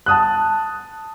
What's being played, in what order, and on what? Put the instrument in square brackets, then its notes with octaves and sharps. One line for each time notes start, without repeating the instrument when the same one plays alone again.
[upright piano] A5 D#6 F#6